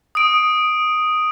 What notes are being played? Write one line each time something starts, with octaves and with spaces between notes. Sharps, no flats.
D#6 D7